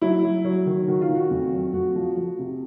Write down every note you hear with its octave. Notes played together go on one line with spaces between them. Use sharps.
F#3 E4
F#3
F#3
D#3
D#3 F#4
F4
D#3
F#4
F2
F#3
F2 F#4
F3
F3
C3